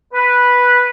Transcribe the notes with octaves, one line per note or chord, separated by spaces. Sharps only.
B4